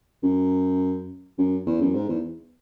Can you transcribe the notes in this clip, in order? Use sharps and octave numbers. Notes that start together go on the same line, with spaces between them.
F#2
F#2
E2
F#2
G#2
E2